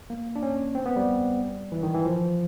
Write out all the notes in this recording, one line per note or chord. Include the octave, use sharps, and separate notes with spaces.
A#3
D4
C#4
C4
B3
G3
E3
D#3
E3
F3